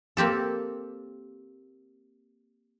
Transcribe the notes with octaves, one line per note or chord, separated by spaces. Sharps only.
A#3 C4 G4 A4